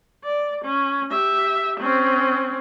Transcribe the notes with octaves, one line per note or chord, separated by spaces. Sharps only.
D5
C#4
G4 E5
C4 C#4